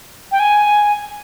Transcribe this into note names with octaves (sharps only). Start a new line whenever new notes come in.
G5
G#5